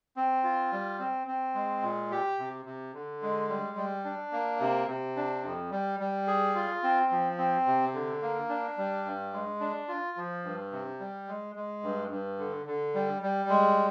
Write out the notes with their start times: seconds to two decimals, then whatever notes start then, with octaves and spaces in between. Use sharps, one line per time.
0.16 C4
0.44 F4
0.72 G3
0.99 C4
1.27 C4
1.54 G#3
1.82 A#2
2.11 G4
2.39 C3
2.65 C3
2.93 D3
3.22 G#3
3.49 G3
3.77 G3
4.04 D4
4.32 A#3
4.61 C3
4.88 C3
5.16 D4
5.44 F2
5.71 G3
6.00 G3
6.27 G#4
6.55 F4
6.83 C4
7.11 F3
7.38 C4
7.66 C3
7.93 D3
8.22 A#3
8.49 D4
8.77 G3
9.05 G2
9.33 G#3
9.60 D4
9.88 F4
10.17 F3
10.44 G2
10.72 C3
11.00 G3
11.28 G#3
11.56 G#3
11.83 G2
12.11 G2
12.38 D3
12.66 D3
12.94 G3
13.22 G3
13.49 G#3